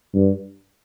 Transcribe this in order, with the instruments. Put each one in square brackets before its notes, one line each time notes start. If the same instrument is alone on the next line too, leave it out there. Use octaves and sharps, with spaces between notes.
[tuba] G2